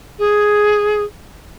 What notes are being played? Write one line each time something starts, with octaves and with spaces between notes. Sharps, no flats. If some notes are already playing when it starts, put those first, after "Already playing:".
G#4